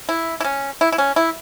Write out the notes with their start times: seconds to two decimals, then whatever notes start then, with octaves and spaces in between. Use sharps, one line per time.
0.09 E4
0.40 E4
0.44 C#4
0.81 E4
0.92 E4
0.98 C#4
1.16 E4